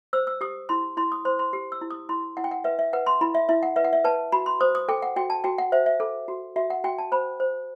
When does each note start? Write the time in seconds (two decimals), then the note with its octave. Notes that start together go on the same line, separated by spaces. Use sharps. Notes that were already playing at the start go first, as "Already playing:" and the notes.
0.13 C5 E6
0.27 E6
0.41 G4 D#6
0.69 E4 C6
0.97 E4 C6
1.12 D#6
1.25 C5 C6
1.39 C6
1.53 G4
1.72 E6
1.81 E4
1.90 D#6
2.09 E4 C6
2.37 E4 F#5
2.44 G5
2.51 F#5
2.64 B4 E5
2.79 E5
2.93 B4 F#5
3.06 C6
3.21 E4 B5
3.35 E5
3.49 E4 E5
3.63 F#5
3.76 B4 E5
3.84 F#5
3.93 E5
4.04 B4 A5
4.32 F#4 B5
4.46 C6
4.61 C5 D#6
4.75 D#6
4.88 A4 G5
5.02 F#5
5.16 F#4 G5
5.30 A5
5.44 F#4 G5
5.58 F#5
5.72 C5 E5
5.86 E5
6.00 A4
6.28 F#4
6.56 F#4 E5
6.70 F#5
6.84 F#4 G5
6.98 A5
7.12 C5 B5
7.40 C5